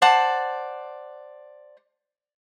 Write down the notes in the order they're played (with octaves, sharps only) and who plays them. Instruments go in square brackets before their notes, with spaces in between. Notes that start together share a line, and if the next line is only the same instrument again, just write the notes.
[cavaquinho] C5 D5 F#5 A5